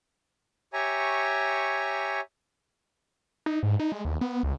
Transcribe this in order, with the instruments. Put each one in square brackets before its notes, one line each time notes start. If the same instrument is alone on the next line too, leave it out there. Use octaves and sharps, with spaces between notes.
[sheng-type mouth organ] G4 C#5 E5 G#5 A#5 C#6
[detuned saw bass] D#4
G#2
D#4
G#3
D#2
B3
C#2